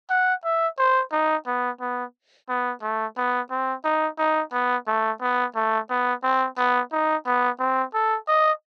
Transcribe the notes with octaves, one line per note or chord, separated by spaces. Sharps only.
F#5
E5
C5
D#4
B3
B3
B3
A3
B3
C4
D#4
D#4
B3
A3
B3
A3
B3
C4
B3
D#4
B3
C4
A4
D#5